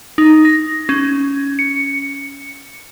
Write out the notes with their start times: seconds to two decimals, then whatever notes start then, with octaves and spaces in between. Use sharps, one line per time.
0.18 D#4
0.45 A#6
0.89 C#4
1.59 C#7